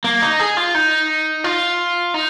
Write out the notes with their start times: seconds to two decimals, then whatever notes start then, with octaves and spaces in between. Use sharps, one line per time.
0.04 A#3
0.22 D#4
0.39 G#4
0.57 F4
0.75 D#4
1.44 F4
2.14 D#4